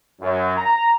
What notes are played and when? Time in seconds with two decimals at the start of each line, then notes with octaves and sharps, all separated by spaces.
0.21 F#2
0.57 A#5